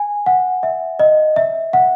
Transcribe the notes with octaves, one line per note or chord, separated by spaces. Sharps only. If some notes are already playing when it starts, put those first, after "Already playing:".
Already playing: G#5
F#5
E5
D#5
E5
F#5